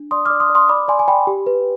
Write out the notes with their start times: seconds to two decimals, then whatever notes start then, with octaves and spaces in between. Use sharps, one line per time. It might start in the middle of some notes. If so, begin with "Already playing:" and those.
Already playing: D4
0.11 D5 C6 D#6
0.26 D6 F6
0.30 D5
0.40 C6 D#6
0.50 D5
0.55 C6 D#6
0.69 D5 B5 D6
0.88 D5 G#5 C6
0.99 G#5
1.08 D5 G5 B5
1.27 G4
1.46 B4